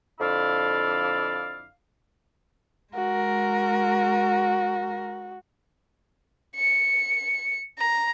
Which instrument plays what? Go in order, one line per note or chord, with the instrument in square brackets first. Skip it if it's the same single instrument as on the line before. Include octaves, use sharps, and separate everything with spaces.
[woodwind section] F2 D3 E4 D5 F5
[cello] G#3 A#4 [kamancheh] F#4
[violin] C#7
A#5